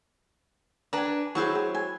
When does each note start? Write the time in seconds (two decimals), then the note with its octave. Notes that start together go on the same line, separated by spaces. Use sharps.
0.93 D4 B4 G#5 A#5
1.35 F#3 E4 G#4 C5 C#6
1.55 G#4
1.74 G#5